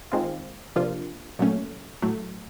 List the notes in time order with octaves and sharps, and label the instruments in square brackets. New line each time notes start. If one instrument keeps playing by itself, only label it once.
[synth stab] D#3 G#3 C4 F4
C3 F3 A#3 D4 F4
A#2 F#3 A3 C#4
A2 F#3 A3